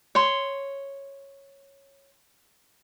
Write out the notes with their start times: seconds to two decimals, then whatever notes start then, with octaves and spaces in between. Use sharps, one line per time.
0.15 C#5 C6